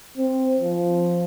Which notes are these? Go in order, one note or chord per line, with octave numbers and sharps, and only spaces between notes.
C4
F3